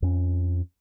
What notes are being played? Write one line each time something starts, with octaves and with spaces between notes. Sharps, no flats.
F2 C#4